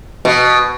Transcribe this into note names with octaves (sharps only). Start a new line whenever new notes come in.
B2